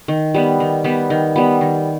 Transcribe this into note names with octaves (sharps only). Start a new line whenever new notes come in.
D#3
G3 B3
D#3
G3 B3
D#3
G3 B3
D#3